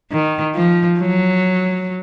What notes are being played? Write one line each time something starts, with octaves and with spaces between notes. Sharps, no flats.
D#3
F3
F#3